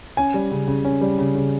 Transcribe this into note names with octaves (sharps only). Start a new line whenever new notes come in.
C#4 G#5
G3
C#3
C#3
C#4
G3
C#3
C#3